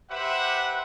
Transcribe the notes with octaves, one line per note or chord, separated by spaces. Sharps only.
G4 B4 C5 E5 F#5